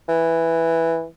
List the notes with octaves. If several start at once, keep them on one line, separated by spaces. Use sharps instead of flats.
E3